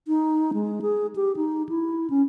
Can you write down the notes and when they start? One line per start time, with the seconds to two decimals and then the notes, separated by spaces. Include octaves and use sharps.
0.08 D#4
0.53 G#3
0.82 G#4
1.16 G4
1.36 D#4
1.69 E4
2.10 C#4